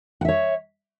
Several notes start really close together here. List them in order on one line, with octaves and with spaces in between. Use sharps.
F#5 E5 C#5